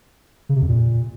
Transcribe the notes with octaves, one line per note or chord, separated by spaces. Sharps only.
C#3
C3
F2
A#2